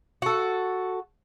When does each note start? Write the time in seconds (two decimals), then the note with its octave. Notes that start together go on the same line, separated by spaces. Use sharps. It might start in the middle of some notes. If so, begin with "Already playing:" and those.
0.22 F#4 A4